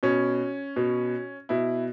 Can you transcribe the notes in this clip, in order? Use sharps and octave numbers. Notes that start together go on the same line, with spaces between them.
B2 C#4
B2
B2 E4